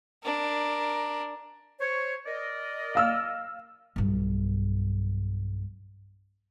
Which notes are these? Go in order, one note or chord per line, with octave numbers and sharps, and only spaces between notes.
D4 A#4
C5 C#5
A#4 D5 D#5
F5 E6 F6
B1 G2